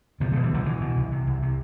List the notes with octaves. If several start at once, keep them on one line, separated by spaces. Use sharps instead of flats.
B2 D3 F3
B2 F3 A3
E3 G3
C2 D3 F3
B2 E3
B2
C2
C3
C2
C3